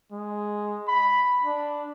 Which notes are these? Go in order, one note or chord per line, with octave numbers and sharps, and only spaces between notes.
G#3
B5
D4